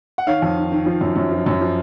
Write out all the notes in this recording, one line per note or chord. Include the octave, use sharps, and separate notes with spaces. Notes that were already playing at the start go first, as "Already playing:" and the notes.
F#5
D#3 C#5 F5
F2
D#3
D#3
F3
F#2
F#2
F3
F#2
F3